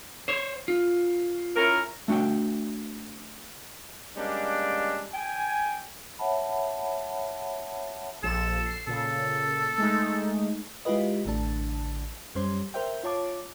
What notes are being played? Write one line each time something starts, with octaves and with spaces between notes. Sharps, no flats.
C5 C#5
F4
C#4 E4 A#4
A3 D4 F#4 D5 G5
G3 G#3 A#3 C#4 D4
G5 G#5
C#5 E5 F#5 A5 B5
A#1 F3 A4 E7
C7
A#2 C#3 A4
G#3 A3 D#4
G#3 E4 F4 G4 B4 D#5
A1 D3 A3 D4 A5
F#2 G3 C#4 C5 C6
A#4 C5 E5 G5
F4 C#5 A5 D6